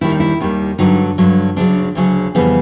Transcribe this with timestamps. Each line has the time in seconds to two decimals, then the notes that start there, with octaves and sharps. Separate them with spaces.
0.01 D#2 D#3 G3 E4
0.10 D#4
0.20 E4
0.40 D#2 D#3 G3
0.79 G2 D3 F#3 D#4
1.18 G2 D3 F#3
1.56 D2 C#3 F#3 D4
1.95 D2 C#3 F#3
2.35 F2 C#3 E3 G3 B3